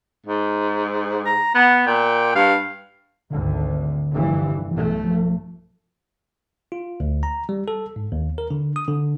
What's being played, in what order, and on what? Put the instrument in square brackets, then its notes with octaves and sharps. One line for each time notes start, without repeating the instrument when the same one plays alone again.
[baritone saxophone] G#2
[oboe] A#5
[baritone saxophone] B3 [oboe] F#5
[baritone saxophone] A#2 [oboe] G5
[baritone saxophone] G2 [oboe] F5
[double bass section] G#1 D2 [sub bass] D3
[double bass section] F1 G2 E3
[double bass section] B1 A3 [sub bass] E3
[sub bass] F3
[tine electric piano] F4
D2
A#5
G3
A4
G#2
D#2
A#4
D3
D#6
D3